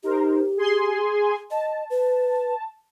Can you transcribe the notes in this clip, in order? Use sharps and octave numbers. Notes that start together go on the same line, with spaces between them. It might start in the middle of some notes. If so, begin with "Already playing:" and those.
D#4 G4 A#4 C5
G#4 G#5 C6
D#5 A5
B4